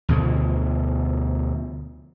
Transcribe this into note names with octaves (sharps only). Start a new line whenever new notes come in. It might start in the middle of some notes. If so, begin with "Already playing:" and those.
D2 B2 D3 F3